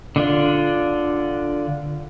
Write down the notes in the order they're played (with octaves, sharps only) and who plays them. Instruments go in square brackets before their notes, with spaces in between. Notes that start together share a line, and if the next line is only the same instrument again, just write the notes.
[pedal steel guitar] D3 D4 F4